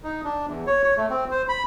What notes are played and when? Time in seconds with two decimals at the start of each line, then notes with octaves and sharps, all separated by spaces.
0.03 D#4
0.24 D4
0.47 E2
0.67 C#5
0.84 C#5
0.97 A3
1.10 C4
1.31 C5
1.49 B5